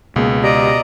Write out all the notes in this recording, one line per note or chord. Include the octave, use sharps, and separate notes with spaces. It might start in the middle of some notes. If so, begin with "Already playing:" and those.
C#2 B2 A#3 G#4
G4 D5 D#5 A#5